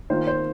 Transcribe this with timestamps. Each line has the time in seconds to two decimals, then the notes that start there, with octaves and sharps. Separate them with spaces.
0.10 D#3 A#3 F4 C5
0.27 C5